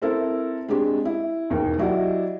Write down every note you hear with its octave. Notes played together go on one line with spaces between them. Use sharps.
C4 E4 A4 A#4 C5
G#3 C4 D4 G4
E4
E1 D#2 A#4
F#3 E4 F#4 G4 D5 D#5